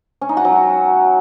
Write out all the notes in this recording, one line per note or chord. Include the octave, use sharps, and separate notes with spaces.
C#4
D#4
F#4
F#3
F#4